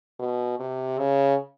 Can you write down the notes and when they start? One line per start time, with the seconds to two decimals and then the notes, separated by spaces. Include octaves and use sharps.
0.19 B2
0.59 C3
0.98 C#3